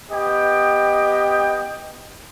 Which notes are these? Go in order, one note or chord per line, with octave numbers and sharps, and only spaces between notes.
B3 G4 D#5 G5